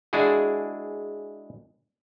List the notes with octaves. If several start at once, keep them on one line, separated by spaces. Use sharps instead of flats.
G#3 D4 E4 F#4 G#4